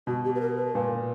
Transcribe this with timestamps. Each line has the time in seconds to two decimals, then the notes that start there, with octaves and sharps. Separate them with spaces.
0.07 B2 F#4
0.25 G4
0.35 B4
0.41 A#4
0.57 B4
0.75 A#2 B4